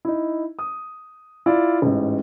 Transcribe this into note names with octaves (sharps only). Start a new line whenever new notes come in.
D#4 E4
D#6
E4 F4 D5
A1 G#2